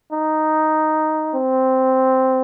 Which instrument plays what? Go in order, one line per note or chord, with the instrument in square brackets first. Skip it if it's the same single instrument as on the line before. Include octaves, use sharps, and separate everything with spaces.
[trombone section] D#4
C4